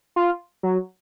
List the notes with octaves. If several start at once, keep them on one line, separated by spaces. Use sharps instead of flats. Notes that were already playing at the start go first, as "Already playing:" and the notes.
F4
F#3